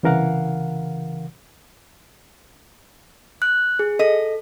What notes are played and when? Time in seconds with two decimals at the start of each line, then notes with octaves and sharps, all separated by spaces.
0.03 C2 C#3 E3 A#4 F5 F#5
3.42 F#6
3.79 G#4
3.99 A4 D#5